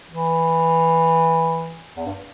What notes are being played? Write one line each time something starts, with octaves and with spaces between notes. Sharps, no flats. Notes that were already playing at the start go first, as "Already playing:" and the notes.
E3
E2
G2